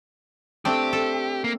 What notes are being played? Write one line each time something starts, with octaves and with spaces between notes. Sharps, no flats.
A3 C4 D4 G4
A4
A#3